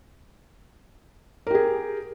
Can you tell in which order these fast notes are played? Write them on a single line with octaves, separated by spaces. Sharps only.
A#4 G4 G#4